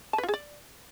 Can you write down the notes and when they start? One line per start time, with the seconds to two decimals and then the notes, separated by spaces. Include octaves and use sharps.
0.13 A5
0.18 B4
0.23 F4
0.28 G#4
0.34 D5